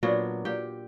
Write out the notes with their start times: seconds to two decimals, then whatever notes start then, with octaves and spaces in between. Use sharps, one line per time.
0.03 A#2 F#3 B3 D4
0.45 A#2 G4 G5